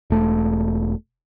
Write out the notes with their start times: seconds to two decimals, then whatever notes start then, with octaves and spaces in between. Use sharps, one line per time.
0.10 E1 A3